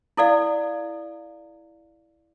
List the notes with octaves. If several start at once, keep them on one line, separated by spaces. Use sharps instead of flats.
E4 A4 D5 F5